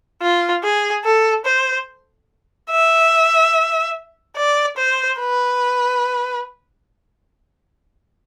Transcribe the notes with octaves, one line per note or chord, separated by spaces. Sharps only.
F4
G#4
A4
C5
E5
D5
C5
B4